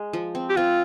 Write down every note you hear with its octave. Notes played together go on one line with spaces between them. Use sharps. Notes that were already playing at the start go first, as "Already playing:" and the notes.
Already playing: G#3
F3
C4
G4
C4 F4